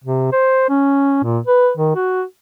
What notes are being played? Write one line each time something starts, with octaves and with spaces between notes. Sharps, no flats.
C3
C5
C#4
A#2
B4
D#3
F#4